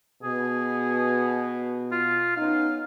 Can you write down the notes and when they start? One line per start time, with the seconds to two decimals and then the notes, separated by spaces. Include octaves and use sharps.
0.23 B2 G#4
1.92 F4
2.36 B3 C#4 D#4 F5